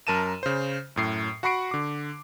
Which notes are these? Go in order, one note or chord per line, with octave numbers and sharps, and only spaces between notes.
F#2 A#4 A5 D#7 E7
C#3 C5
F#2 A2 C7
F#4 F#5 B5 C#6 C7 D7
D3 D6